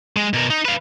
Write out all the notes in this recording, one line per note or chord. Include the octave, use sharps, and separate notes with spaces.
G#3
B2 A#4
D#4
B4 F5